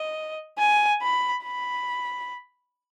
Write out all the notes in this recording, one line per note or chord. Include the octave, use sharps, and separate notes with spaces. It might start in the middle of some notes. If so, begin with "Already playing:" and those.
Already playing: D#5
G#5
B5
B5